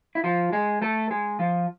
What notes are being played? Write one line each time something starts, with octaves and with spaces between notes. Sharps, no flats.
E4
F3 F4
G#3 G#4
A3 A4
G#3 G#4
F3 F4